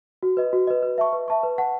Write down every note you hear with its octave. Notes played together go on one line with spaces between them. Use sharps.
F#4
B4 D#5
F#4
B4 D#5
B4
E5 A5 C#6
B4
E5 A5 C#6
B4
F#5 A5 C#6